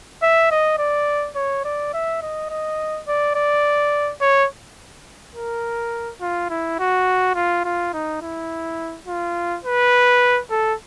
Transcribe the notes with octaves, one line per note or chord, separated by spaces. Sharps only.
E5
D#5
D5
C#5
D5
E5
D#5
D#5
D5
D5
C#5
A#4
F4
E4
F#4
F4
F4
D#4
E4
F4
B4
A4